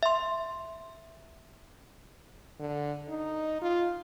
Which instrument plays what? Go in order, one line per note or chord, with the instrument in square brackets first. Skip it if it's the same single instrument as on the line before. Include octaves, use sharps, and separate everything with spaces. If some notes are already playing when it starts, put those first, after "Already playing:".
[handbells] E5 C6
[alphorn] D3
D#4
F4